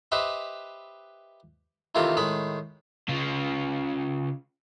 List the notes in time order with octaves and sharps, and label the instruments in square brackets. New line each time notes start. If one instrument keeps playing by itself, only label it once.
[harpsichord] G4 B4 C5 D#5 E5
C3 D#3 E3 A3 F4 G4
A2 D#3 G#3 G#4 B5
[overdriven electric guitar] C#3 F4